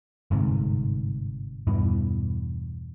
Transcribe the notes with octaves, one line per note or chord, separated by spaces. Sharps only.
G1 G#2 C3
E2 G2 B2 E3